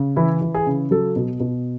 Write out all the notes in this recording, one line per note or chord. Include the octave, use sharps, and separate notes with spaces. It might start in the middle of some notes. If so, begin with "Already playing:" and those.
Already playing: C#3
E3 E4
E3
G#4
C#3
F#3 A4
B2
B2